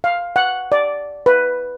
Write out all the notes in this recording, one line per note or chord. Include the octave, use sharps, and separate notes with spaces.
F5
F#5
D5
B4